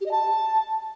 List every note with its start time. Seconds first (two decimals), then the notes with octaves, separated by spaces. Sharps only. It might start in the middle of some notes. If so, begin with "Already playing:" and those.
0.01 G4
0.06 D#5
0.11 A5